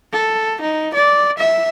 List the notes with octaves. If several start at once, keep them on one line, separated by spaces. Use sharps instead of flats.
A4
D#4
D5
E5